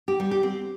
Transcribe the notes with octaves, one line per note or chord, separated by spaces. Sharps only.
G4
G3
G4
C4